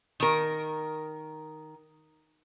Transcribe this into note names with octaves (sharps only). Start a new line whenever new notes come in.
D#3 A#4